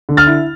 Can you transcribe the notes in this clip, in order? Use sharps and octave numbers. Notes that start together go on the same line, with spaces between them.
D3
F6 A6
E4